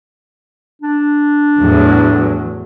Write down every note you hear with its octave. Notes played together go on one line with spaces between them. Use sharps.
D4
E2 A2 F#3